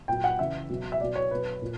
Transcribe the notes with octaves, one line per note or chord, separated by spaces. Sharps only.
A#2 F#3 G5
F#5
C#3 E3 E5
B2 F#3
E5
B2 F#3 D5
C#5
B2 F#3 B4
A#2